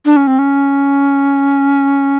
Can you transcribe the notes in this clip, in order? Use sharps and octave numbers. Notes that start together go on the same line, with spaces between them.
D4
C#4
C4
C#4